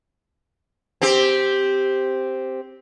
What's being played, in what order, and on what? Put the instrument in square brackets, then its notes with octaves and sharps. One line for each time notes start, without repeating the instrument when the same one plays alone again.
[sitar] C4 G4